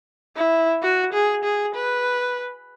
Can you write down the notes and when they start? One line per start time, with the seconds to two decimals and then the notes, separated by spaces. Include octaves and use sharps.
0.36 E4
0.82 F#4
1.13 G#4
1.44 G#4
1.75 B4